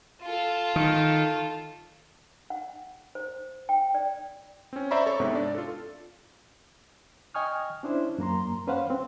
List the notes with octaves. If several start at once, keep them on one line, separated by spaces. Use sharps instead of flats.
F4 A4
D#3
F#5
C5
G5
D5
C4 C#4
C5 D5 E5 A#5 B5 C#6
A4 C#5 C#6
G#2 C3 B3 C4 E5
D4 D5
F4 A4
D#5 G5 G#5 C#6 D#6 F6
C#4 D4 E4 C5
F#2 A#3 A#5 C6
C#4 B4 C5 F5 F#5
C4